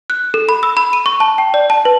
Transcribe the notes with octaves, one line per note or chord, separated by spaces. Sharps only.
F#6
A4
B5
E6
B5
D#7
C#6
A5
G5
D5
A5
B4